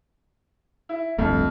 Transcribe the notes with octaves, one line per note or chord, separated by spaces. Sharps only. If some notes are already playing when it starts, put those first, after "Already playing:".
E4
D1 G1 F2 A3